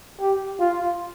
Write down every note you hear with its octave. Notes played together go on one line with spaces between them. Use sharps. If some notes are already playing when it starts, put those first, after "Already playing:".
G4
F4